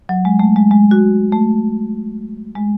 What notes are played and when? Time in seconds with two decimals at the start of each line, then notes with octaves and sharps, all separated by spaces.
0.09 F#3
0.25 G#3
0.39 A3
0.56 G#3
0.71 G#3
0.91 F#4
1.32 A3
2.55 G#3